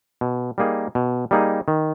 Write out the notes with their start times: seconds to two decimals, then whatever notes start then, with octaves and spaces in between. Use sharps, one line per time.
0.21 B2
0.58 G3 A#3 D#4 G#4
0.95 B2
1.31 G3 A#3 D#4 G#4
1.68 D#3